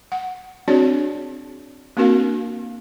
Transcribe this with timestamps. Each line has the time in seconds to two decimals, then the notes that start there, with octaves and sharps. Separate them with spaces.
0.12 F#5
0.68 C4 D4 F#4 G#4 C#5 D5
1.97 A#3 C4 D4 F#4 A#4 F5